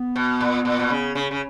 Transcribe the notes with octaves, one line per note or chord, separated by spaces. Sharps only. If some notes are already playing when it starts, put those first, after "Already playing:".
Already playing: B3
B2
A#2
A#2
B2
C#3
C#3
C#3